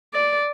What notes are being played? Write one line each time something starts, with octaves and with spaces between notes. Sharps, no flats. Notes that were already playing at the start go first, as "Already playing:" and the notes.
D5